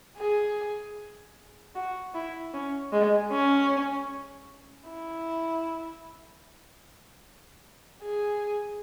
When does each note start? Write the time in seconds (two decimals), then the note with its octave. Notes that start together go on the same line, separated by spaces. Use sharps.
0.17 G#4
1.75 F#4
2.14 E4
2.54 C#4
2.92 G#3
3.32 C#4
4.89 E4
8.03 G#4